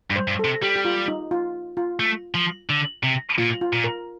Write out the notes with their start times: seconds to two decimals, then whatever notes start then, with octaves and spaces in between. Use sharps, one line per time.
0.10 G2
0.16 C5
0.28 G2
0.39 A4
0.45 C3
0.62 G3 G4
0.75 G4
0.85 F4
1.08 D#4
1.31 F4
1.77 F4
2.00 A3
2.35 F3
2.70 D3
3.03 C3
3.38 A#2 F4
3.61 F4
3.73 A#2
3.84 A#4